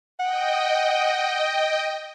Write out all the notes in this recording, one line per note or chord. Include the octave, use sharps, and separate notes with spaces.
D#5 F#5 G5